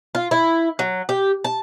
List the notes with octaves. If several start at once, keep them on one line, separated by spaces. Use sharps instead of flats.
F4
E4
F#3
G4
A5